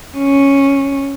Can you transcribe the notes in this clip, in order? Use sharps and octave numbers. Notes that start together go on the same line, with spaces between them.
C#4